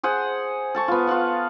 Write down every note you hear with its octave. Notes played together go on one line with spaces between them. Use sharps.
G#4 C5 F#5
A4 A5 C#6
B3 F4
F4 F5 F#5 C#6